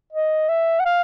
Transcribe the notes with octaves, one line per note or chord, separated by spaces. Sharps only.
D#5
E5
F#5
F5